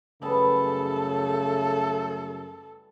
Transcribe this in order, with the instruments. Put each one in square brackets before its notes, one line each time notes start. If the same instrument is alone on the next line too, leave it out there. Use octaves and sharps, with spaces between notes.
[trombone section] F#2 A3 [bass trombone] C#3 [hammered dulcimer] E3 G3 B3 [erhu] A4